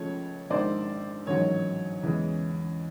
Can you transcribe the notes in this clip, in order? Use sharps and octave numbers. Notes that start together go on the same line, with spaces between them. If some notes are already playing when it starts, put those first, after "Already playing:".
Already playing: C#2 C#3 F3 A3 C#5
A#1 G#2 D#3 G#3 C5 D5
A1 G#2 D#3 F#3 C#5
E2 C#3 E3 G#3